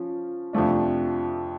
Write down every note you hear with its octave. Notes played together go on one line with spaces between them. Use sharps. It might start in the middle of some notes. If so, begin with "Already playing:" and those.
Already playing: F3 C#4
F2 C3 F3 A3 D4